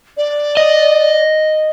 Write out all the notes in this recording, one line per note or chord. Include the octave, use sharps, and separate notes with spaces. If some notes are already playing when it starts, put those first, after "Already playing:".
D5
D#5